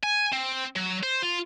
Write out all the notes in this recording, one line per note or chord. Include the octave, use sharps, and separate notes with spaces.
G#5
C4
F#3
C5
F4